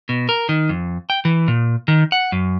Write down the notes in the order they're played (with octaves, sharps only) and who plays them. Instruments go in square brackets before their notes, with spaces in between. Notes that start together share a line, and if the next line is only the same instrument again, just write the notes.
[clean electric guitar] B2
A#4
D#3
F2
G5
E3
A#2
D#3
F#5
F#2